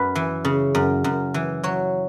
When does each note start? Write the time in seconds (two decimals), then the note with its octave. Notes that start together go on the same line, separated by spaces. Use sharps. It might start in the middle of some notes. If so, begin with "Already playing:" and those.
Already playing: F#2 B4
0.15 E3
0.45 C#3
0.75 F#2
1.04 F#2
1.34 E3
1.63 F#3 C#5